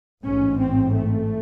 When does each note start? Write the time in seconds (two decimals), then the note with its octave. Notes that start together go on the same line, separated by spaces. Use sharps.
0.24 A1 G#2 C#4
0.58 C4
0.92 A3